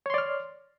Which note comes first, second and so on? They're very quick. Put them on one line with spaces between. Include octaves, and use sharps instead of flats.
C#5 C6 D5 F6